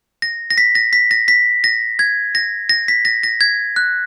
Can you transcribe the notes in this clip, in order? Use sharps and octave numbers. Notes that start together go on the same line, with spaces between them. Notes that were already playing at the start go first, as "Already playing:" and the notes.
A#6
A#6
B6
A#6
B6
A#6
B6
A#6
G#6
A#6
A#6
B6
A#6
A#6
G#6
F#6